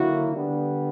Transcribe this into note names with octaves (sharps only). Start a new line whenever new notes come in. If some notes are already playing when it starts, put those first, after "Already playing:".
Already playing: D3 F#3 A#3 E4 F#4
D3 G3 B3 D4